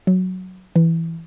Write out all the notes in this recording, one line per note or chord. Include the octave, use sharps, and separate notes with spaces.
F#3
E3